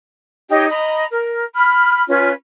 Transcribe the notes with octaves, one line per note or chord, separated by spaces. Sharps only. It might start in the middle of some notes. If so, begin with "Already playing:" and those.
D#4 G4 C#5 D#5
D#5 A#5 B5
A#4
B5 F6
C#4 F4 B4